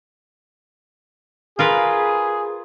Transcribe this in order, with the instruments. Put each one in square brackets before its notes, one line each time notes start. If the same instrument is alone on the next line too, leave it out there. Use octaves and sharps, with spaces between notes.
[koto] F4 A#4 B4 [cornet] G#4